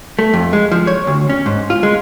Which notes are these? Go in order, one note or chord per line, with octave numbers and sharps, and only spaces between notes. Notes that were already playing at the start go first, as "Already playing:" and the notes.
A3
F2
G#3
F3
C#5
D2
C#4
G#2
F4
G#3